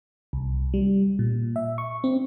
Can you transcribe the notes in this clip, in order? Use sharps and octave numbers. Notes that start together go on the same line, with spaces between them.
C2
G3
A#2
E5
C#6
C4